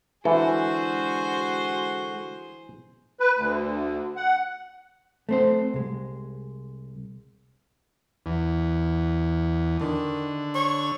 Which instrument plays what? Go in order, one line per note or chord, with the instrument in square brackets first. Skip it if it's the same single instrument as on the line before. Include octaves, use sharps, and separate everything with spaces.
[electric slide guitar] D3 G#3 A4 [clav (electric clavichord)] E3 [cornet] F#4 [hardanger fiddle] G#4 C5
[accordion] B4
D2
F#5
[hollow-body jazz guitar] A3 C4 C5
C2 G#3
[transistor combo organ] E2
[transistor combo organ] D3 [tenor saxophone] D#3
[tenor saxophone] C#5